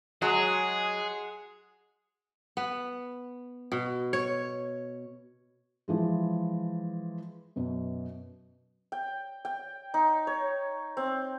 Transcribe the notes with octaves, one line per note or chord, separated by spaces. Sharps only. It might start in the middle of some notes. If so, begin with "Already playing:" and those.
F#3 G#3 G#4 F#5
B3
B2
C#5
E3 F3 G#3
F#2 B2
G5
G5
D#4
C#5
C4